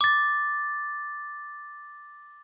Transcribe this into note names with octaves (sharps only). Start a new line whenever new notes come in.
D6 A6